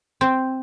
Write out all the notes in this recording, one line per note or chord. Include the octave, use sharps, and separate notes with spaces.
C4